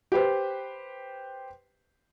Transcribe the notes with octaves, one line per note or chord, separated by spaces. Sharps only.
G4 B4 C5